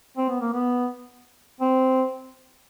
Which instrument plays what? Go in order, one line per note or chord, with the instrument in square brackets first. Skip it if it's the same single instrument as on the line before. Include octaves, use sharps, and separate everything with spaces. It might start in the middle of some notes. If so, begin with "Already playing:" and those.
[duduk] C4
B3
A#3
B3
C4